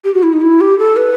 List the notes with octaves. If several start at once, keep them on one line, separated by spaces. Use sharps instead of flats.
G4
F#4
E4
D#4
E4
G4
A4
B4